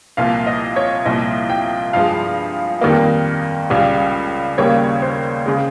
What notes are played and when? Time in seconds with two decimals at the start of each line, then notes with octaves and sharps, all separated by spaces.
0.17 C2 A#2 F3 F5
0.47 D#5
0.76 C#5
1.06 C2 A#2 F3 D#5
1.50 G5
1.93 G2 F3 G#3 F5
2.81 F2 D#3 G3 A#3
3.70 C#2 C#3 G3
4.58 D#2 C#3 G3 A#3 C#5
5.02 C5
5.46 C#3 G#3